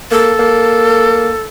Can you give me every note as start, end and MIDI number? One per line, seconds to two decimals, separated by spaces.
0.11 0.33 58
0.11 1.42 69
0.39 1.30 58